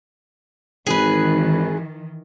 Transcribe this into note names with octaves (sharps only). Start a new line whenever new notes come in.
G#1 D#3 E3 G#4 B4